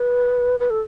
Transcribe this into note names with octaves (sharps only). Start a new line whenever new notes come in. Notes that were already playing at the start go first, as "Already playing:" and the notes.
Already playing: B4
B4
A4